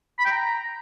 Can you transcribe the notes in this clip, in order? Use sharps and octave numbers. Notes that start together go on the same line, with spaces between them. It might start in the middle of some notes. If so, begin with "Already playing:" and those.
B5
G5
A#5